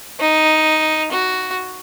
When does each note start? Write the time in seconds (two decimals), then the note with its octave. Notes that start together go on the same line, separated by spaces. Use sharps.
0.20 D#4
1.11 F#4